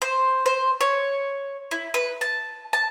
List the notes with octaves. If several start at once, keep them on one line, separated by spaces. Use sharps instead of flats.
C5
C5
C#5
E4
B4
A5
A5